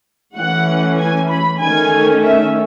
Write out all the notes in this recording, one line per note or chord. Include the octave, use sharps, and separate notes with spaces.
E3 A3 C#4 F#5
G#5
B5
D#3 A3 C#4 G#5
E5